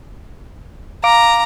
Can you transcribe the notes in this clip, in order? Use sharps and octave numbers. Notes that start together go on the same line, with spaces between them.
F5 A#5 D6 D7